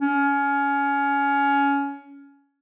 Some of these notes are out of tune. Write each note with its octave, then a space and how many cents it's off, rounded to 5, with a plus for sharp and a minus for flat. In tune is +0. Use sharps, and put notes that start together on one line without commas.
C#4 +20